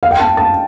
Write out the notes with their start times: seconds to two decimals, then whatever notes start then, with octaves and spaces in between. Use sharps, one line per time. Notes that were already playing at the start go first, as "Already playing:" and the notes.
0.03 F5
0.11 G5
0.19 A5
0.37 A5